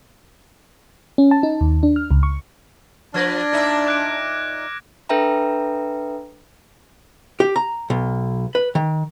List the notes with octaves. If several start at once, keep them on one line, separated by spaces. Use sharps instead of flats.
C#4
A5
D#4
D#2
D4
F6
C#2
C#6
F3 D4 B4 F6 G#6 A#6
A#2 D#4 E5
D6 F#6 D7
D4 A4 B4 E5 G5 A#5
G4
A#5
B1
B4
D#3